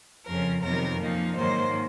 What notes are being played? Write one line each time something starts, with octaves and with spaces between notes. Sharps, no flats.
F2 C#3 F3 A#4
F2 C3 D#3 F#3 B3 A#4
A#2 F3 A#3 D#4
G#2 D#3 F#3 A#3 C5